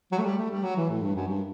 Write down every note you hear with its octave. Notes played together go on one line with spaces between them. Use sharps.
F#3
A3
G3
A3
G3
F#3
E3
A2
G2
F#2
G2